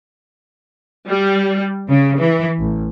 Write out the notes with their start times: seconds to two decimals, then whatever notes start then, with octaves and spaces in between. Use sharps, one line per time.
1.09 G3
1.87 C#3
2.18 E3
2.60 A1